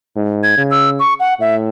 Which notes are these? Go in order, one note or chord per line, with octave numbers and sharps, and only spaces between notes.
G#2
G#6
C#3
E6
C#6
F#5
A2 E5